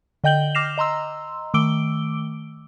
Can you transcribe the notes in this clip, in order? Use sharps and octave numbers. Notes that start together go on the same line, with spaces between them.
D3 D#5 G5 G6 F#7 G7
D6 F6 A#6 C7 E7 F7
D#5 A#5 C6 E6
D#3 A3 D6 E6 D7 G7